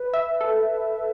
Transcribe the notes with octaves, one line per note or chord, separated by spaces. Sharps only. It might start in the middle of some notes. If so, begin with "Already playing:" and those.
Already playing: B4
E5
A4